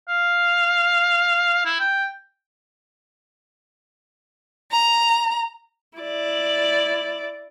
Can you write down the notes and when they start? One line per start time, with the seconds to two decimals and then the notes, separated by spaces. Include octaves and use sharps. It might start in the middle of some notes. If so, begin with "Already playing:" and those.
0.09 F5
1.66 E4
1.80 G5
4.71 A#5
5.98 E4 D5